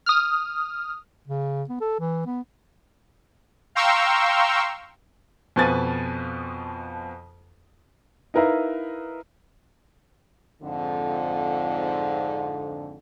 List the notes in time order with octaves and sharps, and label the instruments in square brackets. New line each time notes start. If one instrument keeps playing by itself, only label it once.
[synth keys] D#6 F6
[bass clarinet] C#3
B3
A4
E3
B3
[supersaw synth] F5 G5 A#5 C6 C#6 E6
[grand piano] F2 B2 F3 B4 G#5 A6
[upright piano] D#4 E4 A#4 B4 E5 F5
[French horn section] F2 G#2 D3